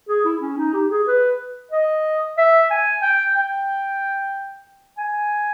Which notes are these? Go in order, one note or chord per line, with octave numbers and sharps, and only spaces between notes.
G#4
E4
C#4
D#4
G4
G#4
B4
D#5
E5
G#5
G5
G5
G#5